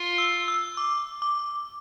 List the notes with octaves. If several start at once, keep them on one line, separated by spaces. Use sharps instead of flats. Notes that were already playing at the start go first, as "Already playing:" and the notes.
Already playing: F4
E6
E6
D6
D6